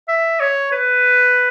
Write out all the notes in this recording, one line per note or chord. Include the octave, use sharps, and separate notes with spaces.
E5
C#5
B4